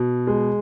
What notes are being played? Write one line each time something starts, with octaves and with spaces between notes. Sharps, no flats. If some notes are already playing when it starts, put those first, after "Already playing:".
Already playing: B2
G#3